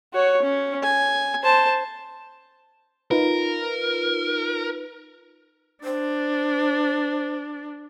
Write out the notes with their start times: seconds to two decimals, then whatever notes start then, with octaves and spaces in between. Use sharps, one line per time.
0.13 F#4 C#5
0.42 C#4
0.83 G#5
1.43 C5 A5
3.11 D#4 F4 A#4 B4
5.84 D4 C5